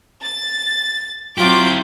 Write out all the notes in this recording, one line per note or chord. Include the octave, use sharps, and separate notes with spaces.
A6
F#3 C4 E4 F4 G4 D6 G6